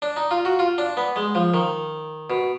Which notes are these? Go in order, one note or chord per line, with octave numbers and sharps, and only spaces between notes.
D4
D#4
F4
F#4
F4
D4
B3
G#3
F3
D#3
B2